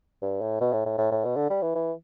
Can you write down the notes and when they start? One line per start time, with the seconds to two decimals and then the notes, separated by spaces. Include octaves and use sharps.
0.22 G2
0.41 A2
0.61 B2
0.73 A2
0.86 A2
0.98 A2
1.11 A2
1.25 B2
1.36 D3
1.50 G3
1.62 E3
1.75 E3